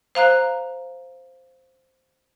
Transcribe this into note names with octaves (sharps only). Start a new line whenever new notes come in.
C5 F5 A#5 F#6